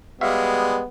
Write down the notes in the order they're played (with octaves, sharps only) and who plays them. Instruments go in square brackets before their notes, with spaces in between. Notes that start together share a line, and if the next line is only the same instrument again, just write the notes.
[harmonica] G3 G#3 [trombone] B3 [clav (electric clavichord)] F#4 E5 F5